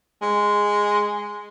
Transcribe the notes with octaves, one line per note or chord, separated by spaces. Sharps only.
G#3